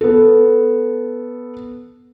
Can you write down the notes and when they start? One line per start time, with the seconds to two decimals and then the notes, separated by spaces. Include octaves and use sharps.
0.01 B3 A4